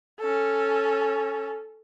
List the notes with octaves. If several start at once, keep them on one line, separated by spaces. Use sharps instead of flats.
C#4 A4